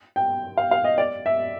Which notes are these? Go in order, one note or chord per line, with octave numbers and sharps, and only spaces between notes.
G5
F5
F5
D#5
D5
E5